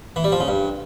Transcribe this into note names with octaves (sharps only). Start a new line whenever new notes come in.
E3
G3
F3
C#3
G2